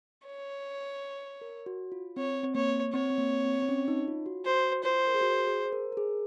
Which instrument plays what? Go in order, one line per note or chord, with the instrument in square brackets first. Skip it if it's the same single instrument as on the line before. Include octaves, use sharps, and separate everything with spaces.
[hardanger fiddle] C#5
[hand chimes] A#4
F#4
F4
[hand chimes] C4 [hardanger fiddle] C#5
[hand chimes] C4
[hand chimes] A#3 [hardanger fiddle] C#5
[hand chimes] C4 [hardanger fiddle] C#5
[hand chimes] C4
A#3
C4
C4
C#4
D#4
F4
F#4
[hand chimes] F#4 [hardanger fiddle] C5
[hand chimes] F4 [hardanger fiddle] C5
[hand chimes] A#4
G#4
F#4
G#4
C5
A#4
A#4
G#4